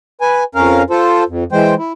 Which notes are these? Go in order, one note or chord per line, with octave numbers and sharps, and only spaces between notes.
B4 G#5
F2 C#4 A#4 F5
F4 A4 C5
F2
E3 G#3 C5 G5
E4